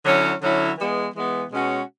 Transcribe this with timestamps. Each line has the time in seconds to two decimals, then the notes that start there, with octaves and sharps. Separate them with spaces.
0.04 D3 F#3 C#4 E4
0.41 D3 F#3 C#4 E4
0.78 E3 G#3 B3
1.15 E3 G#3 B3
1.51 B2 G#3 C#4 F#4